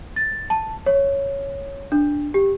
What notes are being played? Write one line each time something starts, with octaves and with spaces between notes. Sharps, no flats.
A6
A5
C#5
D4
G4